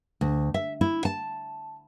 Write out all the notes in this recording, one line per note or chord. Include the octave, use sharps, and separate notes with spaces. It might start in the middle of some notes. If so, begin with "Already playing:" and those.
D2
E5
E4
A5